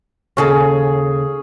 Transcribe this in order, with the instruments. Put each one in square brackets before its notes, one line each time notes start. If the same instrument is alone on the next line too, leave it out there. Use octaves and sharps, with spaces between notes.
[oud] D#2 C#3 A4 [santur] C#4 G#4